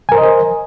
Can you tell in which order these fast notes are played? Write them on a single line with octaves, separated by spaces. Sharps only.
G#5 A#4 C5 D#5